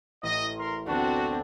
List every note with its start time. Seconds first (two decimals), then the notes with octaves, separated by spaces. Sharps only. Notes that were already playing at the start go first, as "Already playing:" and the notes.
0.23 A1 D#5
0.58 A#4 C6
0.87 D2 B3 C4 D4 F#4